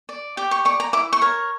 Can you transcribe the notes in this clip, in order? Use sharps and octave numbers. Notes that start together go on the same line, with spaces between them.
D5
G4 D6
C#6
D5 C#6
A#5
E4 D6
C#6
A#4 C#5